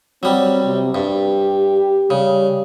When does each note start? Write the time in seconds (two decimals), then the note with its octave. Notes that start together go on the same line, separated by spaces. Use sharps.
0.23 F#3 G3 C4
0.64 C3
0.95 G2 G4
2.10 C#3 G3